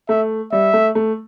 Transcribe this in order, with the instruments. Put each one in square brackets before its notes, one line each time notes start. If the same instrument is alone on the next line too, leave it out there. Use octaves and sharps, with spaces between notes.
[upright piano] A3 [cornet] E5
[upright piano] G3 [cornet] E5
[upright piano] A3
A3